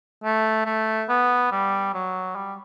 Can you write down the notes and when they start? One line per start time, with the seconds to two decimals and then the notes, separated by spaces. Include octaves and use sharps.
0.24 A3
0.66 A3
1.09 B3
1.52 G3
1.94 F#3
2.36 G3